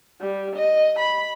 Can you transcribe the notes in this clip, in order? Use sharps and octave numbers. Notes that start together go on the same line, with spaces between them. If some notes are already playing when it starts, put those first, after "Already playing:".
G3
D#5
B5